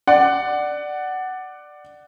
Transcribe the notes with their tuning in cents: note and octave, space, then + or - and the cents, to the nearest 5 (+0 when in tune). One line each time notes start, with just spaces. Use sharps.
D5 +10 F#5 +10